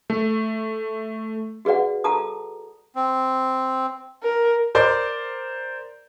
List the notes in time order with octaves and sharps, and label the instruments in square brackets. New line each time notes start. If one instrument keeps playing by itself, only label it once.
[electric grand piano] A3
[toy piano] F#4 G#4 B4 D5 F#5
F4 A4 A5 A#5 D#6
[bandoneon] C4
[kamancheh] A#4
[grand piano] A#4 C5 D5